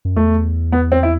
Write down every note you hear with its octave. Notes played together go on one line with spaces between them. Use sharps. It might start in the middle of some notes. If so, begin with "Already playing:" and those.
F#2
E2 A3
B3
C4
E4